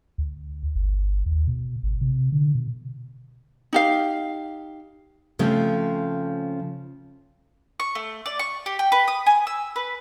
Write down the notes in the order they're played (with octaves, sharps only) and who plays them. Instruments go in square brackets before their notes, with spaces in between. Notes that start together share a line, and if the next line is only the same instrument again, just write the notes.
[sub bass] D2
G1
D#2
B2
G#1
C3
D3
B2
[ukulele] D#4 G4 F5
[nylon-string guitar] C#3 F3 A3 C4
[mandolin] C#6
A3
D5
C#6
G4
G5
B4
D#6
G#5
E6
B4